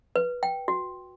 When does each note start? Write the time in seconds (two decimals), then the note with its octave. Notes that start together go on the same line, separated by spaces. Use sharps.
0.16 B4
0.43 G5
0.68 F#4